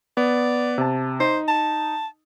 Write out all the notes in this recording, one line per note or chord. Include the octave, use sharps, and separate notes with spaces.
B3 D5
C3 A5
D#4 C5
A5